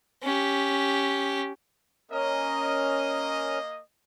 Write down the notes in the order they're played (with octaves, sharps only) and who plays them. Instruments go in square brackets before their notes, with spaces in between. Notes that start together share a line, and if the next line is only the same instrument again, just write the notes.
[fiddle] C#4 G4
[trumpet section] A#3 D#5 [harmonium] C#4 A#4